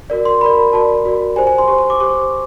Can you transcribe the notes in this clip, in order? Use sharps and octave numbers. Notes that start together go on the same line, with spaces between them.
F#4 A#4 D5
C6
F#4 A#4 D5 B5
A#5
F#4 A#4 D5 A5
F#4 A#4 D5
G4 C5 G#5
G#5
C6
G4 C5 C#6
C#6
D6
G4 C5 C#6